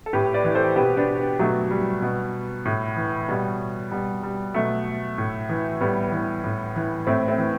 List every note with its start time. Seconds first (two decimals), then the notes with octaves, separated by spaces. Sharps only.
0.06 A4
0.13 A2 G4 B4
0.34 B4 D5
0.44 E3
0.55 A4 C5
0.76 B2 G4 B4
0.97 B3 D4
1.39 B2 F#3 A3
1.71 G3
2.02 B2
2.65 A2
2.97 E3
3.28 B2 G3
3.92 B2 G3
4.23 G3
4.54 B2 F#3 A3
5.18 A2
5.49 E3
5.81 A2 G3 B3
6.12 E3
6.44 A2
6.76 E3
7.07 A2 A3 C4
7.28 A3 C4
7.38 E3